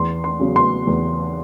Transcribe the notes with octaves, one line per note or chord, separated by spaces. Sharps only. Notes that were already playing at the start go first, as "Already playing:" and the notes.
Already playing: E2 C6
C6
C#3 F#3 B3
C6
E2